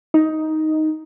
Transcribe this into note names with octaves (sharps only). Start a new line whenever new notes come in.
D#4